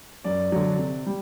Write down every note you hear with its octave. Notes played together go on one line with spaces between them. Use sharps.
F#2 D5
D3 F#3
C3
G3